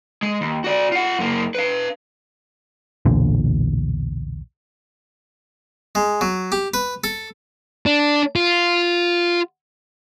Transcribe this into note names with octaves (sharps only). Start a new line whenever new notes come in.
G#3
D#2
F#4 D5
F4 F#5
F#2 A#3
B4 F5
B1 E2 A#2 D3
G#3
F#3
G4
B4
A4
D4
F4